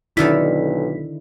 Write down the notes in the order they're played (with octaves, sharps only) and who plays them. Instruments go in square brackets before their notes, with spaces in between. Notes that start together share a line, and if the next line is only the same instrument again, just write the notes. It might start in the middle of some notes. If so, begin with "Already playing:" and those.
[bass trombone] B1 [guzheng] D3 D#3 A4 [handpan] E4 [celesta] B6